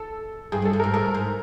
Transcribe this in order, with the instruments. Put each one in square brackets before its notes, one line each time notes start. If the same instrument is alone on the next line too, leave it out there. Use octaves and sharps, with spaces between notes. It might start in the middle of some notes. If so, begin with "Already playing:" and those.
Already playing: [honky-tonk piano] A4
[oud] G2 [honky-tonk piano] G#4
[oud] G2
[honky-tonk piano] A4
[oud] G2
[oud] G#2 [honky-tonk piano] A#4
[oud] A2 [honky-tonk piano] A#4
[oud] G#2